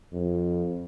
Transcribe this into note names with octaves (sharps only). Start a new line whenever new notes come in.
F2